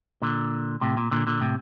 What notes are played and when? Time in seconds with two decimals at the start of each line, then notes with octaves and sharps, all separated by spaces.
0.22 A#2 D3
0.81 A2 C3
0.97 A#2
1.11 A#2 D3
1.27 A#2 D3
1.41 A2 C3